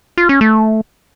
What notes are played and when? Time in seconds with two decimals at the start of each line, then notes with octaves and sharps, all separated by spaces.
0.18 F4
0.29 C#4
0.41 A3